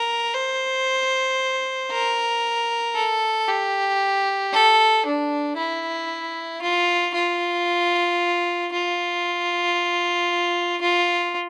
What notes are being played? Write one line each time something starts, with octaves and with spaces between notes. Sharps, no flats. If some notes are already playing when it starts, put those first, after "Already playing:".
Already playing: A#4
C5
A#4
A4
G4
A4
D4
E4
F4
F4
F4
F4